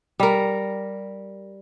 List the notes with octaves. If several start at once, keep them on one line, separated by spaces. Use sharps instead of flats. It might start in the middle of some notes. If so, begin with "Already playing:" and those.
G3 A#4